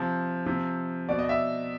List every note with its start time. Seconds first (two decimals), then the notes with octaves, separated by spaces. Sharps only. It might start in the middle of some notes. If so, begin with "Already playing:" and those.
Already playing: C3 F3
0.46 C3 F3
1.09 B2 D5
1.19 D#5
1.29 E5